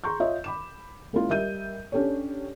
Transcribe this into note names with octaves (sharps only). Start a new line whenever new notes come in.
G#4 A#5 C6 C#6 G6
F4 C#5 D#5 E5
B5 D6 E7
G#3 A#3 C#4 E4 F4
G3 A#4 D#5 E5 G6 D#7
C#4 D4 G4 A4 C#5